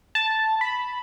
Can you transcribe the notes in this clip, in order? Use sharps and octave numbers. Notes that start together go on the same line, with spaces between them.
A5
B5